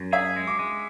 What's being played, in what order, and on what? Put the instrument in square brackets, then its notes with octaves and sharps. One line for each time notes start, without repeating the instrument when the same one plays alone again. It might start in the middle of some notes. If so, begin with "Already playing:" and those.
Already playing: [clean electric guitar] F#2
[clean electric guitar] G#4 [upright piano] E5
[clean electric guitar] G#3
[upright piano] D6
[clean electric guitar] G#3